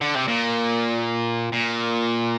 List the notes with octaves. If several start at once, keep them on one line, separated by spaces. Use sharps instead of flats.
D3
C3
A#2
A#2